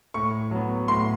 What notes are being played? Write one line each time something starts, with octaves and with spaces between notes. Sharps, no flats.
A2 C#6
F#3 B3
A2 C6